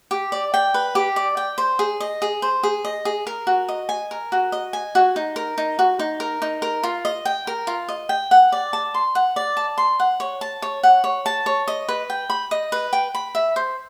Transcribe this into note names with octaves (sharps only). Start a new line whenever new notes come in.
G4
D5
G5
B4
G4
D5
G5
C5
G#4
D#5
G#4
C5
G#4
D#5
G#4
A#4
F#4
D#5
G#5
A#4
F#4
D#5
G#5
F#4
D#4
A#4
D#4
F#4
D#4
A#4
D#4
A#4
F4
D#5
G5
A#4
F4
D#5
G5
F#5
D5
A5
C6
F#5
D5
A5
C6
F#5
C#5
A5
C#5
F#5
C#5
A5
C#5
D#5
B4
G5
B5
D#5
B4
G5
B5
E5
C5